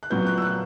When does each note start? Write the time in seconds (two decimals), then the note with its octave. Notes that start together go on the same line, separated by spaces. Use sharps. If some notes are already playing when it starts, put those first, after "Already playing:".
0.03 F#6
0.10 A#2 F#3 B3 G6
0.26 F#6
0.37 E6
0.42 F#6